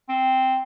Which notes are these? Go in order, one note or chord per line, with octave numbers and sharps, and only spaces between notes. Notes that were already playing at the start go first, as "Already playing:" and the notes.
C4